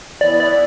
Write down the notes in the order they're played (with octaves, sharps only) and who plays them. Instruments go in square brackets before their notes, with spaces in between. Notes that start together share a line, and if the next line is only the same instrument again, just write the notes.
[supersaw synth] E3 B3 E4 [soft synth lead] D5
[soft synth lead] D5